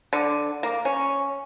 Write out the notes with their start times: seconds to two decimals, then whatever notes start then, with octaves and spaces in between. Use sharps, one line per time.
0.13 D3
0.63 A#3
0.85 C#4